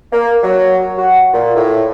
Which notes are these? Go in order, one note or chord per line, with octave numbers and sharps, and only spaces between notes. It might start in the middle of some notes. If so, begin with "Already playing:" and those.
A#3
F#3
F#4
A#2
A2